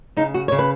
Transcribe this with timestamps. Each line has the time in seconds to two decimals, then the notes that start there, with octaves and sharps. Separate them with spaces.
0.17 C#3 D#4
0.34 F#4
0.48 C#3 C#5
0.59 B4